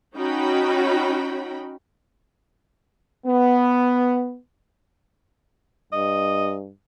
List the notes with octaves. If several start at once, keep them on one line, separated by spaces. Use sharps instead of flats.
C#4 D#4 F#4 G5 B5
B3
G2 D#5